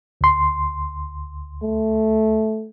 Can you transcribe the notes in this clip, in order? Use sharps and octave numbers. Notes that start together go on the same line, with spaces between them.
D2 C6
A3